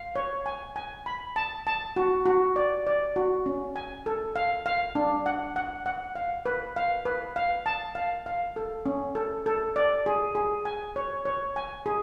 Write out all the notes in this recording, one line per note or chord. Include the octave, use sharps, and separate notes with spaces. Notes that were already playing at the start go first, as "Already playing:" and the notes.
Already playing: F5
C#5
G#5
G#5
B5
A5
A5
F#4
F#4
D5
D5
F#4
C#4
G#5
A4
F5
F5
D4
F#5
F#5
F#5
F5
B4
F5
B4
F5
A5
F5
F5
A4
C#4
A4
A4
D5
G#4
G#4
G#5
C#5
C#5
G#5
G#4